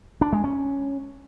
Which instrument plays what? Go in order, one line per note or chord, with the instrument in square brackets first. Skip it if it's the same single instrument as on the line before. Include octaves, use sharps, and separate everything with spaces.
[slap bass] D4
G#3
C#4